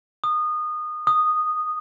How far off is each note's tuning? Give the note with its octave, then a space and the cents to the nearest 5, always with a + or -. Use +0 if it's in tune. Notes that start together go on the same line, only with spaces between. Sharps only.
D#6 -25
D#6 -10